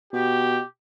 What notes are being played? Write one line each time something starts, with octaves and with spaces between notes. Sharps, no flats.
B2 G4